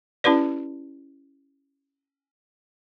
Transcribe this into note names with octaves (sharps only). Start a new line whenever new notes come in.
C#4 E4 G4 B4 D5